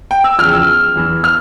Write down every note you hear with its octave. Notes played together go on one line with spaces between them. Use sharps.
G5
E6
E2 C#3 F3 F6
E6
E2 E3
F6